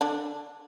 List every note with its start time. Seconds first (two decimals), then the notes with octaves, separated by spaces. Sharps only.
0.01 D3 D4